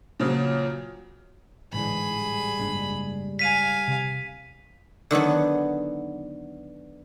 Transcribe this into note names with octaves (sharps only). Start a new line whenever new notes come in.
A#2 C#3 F3 F#3
A1 G#2 D3 E3 G#4 B5
G3
F#1 G#2 D4
F5 G#5 B6 D#7
C3
D3 D#3 F#3 B3